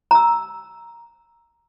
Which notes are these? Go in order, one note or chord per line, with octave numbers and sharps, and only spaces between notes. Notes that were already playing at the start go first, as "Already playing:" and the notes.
A#5 E6